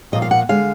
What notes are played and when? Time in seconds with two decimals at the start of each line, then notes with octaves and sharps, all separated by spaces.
0.12 A#2 F3 A#3 D#5
0.22 F5
0.31 F#5
0.49 D3 G#3 F5